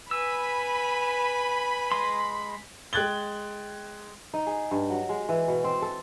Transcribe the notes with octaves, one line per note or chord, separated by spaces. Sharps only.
B4 G#5 B5 E6
G#3 C6
G#3 G5 F#6 G#6 A6 G7
D#4
G#4
G2
F#3
G#3
E3
B2
C4
A4